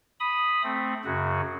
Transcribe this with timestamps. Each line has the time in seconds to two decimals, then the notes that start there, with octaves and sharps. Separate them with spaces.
0.20 B5 D#6
0.63 A3 C4
1.05 F#2 C#3 F#4